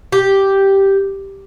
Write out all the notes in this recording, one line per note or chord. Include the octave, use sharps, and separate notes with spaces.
G4